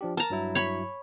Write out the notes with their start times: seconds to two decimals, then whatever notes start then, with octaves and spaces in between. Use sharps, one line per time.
0.01 F3 D4 G4
0.17 A#4 A5 A#5
0.30 G2 F#3 E4
0.55 C#5 B5 C#6